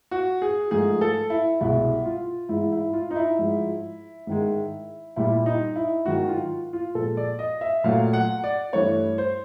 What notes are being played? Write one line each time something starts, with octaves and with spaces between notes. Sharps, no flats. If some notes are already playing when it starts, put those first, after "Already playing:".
F#4
G#4
G#2 F3 A3 G#4
A4
E4
C2 B2 G#3 E4
F4
G#2 E3 G#3 E4
E4
F4
D#4
E4
G#2 F3 G#3
G#2 D#3 G#3
A#2 G3 E4
D#4
E4
G#2 D#3 F#3 F#4
F4
F4
A#2 F3 G#3 A4
D5
D#5
E5
A#2 F#3 A3 F5
F#5
D5
G2 E3 A3 C#5
C5